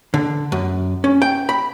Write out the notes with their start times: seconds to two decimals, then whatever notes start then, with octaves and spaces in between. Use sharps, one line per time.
0.14 D3
0.52 F#2
1.04 C#4
1.22 G5
1.49 B5